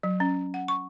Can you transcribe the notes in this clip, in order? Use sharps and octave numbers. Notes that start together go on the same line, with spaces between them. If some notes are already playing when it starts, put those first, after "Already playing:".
F#3
C#4
F#5
C#6